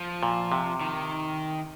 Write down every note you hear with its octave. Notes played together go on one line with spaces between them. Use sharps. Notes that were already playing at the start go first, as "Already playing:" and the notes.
Already playing: F3
A#2
C3
D#3